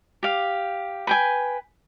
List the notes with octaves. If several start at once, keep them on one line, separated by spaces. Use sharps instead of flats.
G4 F5
B4 G5 G#5